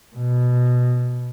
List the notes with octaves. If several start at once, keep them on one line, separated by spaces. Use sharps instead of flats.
B2